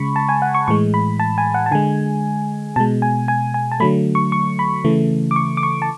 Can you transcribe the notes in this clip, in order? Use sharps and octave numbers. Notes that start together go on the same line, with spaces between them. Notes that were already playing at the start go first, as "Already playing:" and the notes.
Already playing: C#3 G#3 B5 C#6
A5
G#5
F#5
C#6
A2 E3 G#3 C#6
B5
A5
G#5
F#5
A5
D3 G#3 G#5
B2 G#3 A5
G#5
G#5
G#5
A5
D3 F#3 A3 B5
C#6
C#6
B5
C#3 E3 A3
D6
C#6
D6
C#6
A5